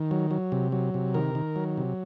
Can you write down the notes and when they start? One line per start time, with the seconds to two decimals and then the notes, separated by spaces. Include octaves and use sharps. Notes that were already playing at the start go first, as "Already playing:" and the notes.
Already playing: D#3
0.11 F#3
0.31 F#3
0.52 C3
0.72 F#3
0.94 C3
1.14 D#3 A#4
1.35 D#3
1.56 F#3
1.77 C3